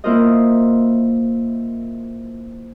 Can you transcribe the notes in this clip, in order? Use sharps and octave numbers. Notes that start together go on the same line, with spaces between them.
A#3 E4 F4 A#4 C5 D#5